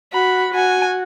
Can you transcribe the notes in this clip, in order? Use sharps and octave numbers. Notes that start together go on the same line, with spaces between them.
F#4 B5
F#4 G#5